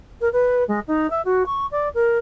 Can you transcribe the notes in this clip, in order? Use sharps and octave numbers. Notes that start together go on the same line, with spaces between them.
A#4
B4
G#3
D#4
E5
F#4
C#6
D5
A#4